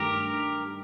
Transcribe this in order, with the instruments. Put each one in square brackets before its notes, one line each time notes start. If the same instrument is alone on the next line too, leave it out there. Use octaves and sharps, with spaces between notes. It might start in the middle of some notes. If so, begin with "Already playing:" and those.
Already playing: [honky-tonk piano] G2 D#3 A3 [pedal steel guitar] G4 A#4